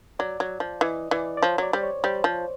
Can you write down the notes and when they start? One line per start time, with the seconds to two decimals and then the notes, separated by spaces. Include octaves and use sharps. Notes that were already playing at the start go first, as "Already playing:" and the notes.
0.19 F#3 D5
0.40 F#3
0.60 F3
0.81 E3 D#5
1.11 E3 D5
1.37 D5
1.43 F3 C#5
1.58 F#3 D5
1.73 G3 C5
1.83 C#5
2.04 G3 C5
2.24 F3